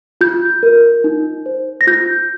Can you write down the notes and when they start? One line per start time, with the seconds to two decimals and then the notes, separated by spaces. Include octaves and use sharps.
0.21 F4 G6
0.63 A#4
1.04 D#4
1.46 C5
1.81 A#6
1.87 F4 G6